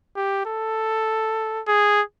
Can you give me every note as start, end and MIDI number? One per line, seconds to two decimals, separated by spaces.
0.16 0.41 67
0.46 1.62 69
1.68 2.02 68